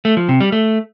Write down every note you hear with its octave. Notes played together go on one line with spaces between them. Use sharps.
A3
F3
C3
G3
A3